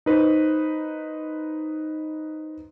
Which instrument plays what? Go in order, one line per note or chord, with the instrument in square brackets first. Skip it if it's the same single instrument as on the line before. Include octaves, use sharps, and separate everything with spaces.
[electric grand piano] D#4 B4 C5